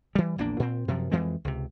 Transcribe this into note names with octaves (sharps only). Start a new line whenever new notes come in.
E3 G3
A#1 E2 A#3 D4
A#2 C4
F#2 C3 F3
F2 E3 G#3 C4
C#2 C3